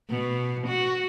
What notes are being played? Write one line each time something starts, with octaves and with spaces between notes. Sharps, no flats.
B2
F#4